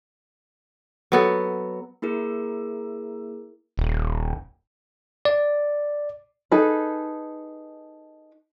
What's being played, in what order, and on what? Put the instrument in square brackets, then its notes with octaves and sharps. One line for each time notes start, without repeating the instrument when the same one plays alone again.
[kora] F#3 B3 A4
[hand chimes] A#3 E4 G#4 A#4
[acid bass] D#1
[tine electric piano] D5
[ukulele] D#4 G#4 A4 B4